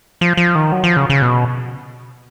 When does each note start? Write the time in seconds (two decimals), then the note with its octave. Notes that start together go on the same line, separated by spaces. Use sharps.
0.21 F3
0.37 F3
0.55 D#3
0.72 F#3
0.84 F3
0.97 C#3
1.10 C#3
1.22 B2